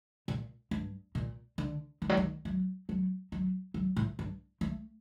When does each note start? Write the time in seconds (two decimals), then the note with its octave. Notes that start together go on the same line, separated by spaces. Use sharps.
0.28 A#2
0.71 G2
1.15 A#2
1.58 D3
2.02 D#3
2.09 F#3
2.17 D#3
2.45 F#3
2.89 F#3
3.32 F#3
3.74 F#3
3.96 A2
4.19 G2
4.61 A3